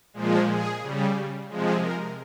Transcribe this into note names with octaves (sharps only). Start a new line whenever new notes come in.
A#2 F3 G#3
G#4
C#3 G3
C3 F3 G#3
A#4